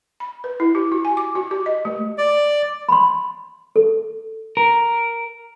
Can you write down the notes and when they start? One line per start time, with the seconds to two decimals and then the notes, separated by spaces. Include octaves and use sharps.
0.20 B5
0.44 B4
0.60 E4
0.75 G4
0.92 F#4
1.05 G#5
1.17 D6
1.35 F#4
1.51 G4
1.66 D#5
1.85 A3
2.18 D5
2.89 B5 C6
3.76 A4
4.57 A#4